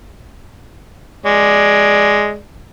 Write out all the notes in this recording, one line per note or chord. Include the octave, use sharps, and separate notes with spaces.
G#3 D5